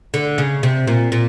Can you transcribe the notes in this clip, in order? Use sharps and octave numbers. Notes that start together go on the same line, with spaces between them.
D3
C#3
C3
A#2
A#2